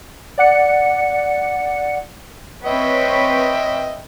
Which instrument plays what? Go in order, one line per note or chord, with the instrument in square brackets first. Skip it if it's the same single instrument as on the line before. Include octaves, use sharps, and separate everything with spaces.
[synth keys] D5 F#5 C#7
[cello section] C4 B4 C#5 [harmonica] D#5 E5 G5